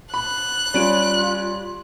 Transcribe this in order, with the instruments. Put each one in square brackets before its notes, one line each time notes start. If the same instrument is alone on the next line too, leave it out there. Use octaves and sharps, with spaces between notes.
[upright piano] B5 [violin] F#6
[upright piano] G3 C#4 D7 [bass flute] F4